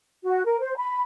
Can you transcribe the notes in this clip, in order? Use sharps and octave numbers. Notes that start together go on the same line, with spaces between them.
F#4
A#4
C5
B5